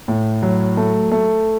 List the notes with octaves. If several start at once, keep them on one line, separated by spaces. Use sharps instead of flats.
A2
F#3
A3
A3